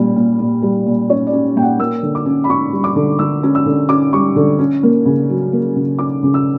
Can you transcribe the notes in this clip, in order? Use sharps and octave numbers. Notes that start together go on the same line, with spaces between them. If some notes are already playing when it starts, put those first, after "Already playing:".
Already playing: A#2 G3 C#4
A#2
A#2
G3
A#2
C#4 C#5
D5
C#4
A#2 G5
F#5
A#3 E6
D3
D6
C#4
B5
C#4 C#6
G3
D6
D3
D3 E6
C#4
E6
D3
C#4 D6
G3 C#6
D3
C#4
A#3
C#3
F#3
A#3
C#3
C#4 D6
C#3
E6